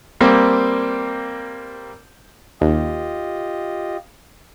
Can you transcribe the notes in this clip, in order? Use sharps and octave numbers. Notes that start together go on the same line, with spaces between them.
G3 A#3 C4
D#2 F4 G4 D#5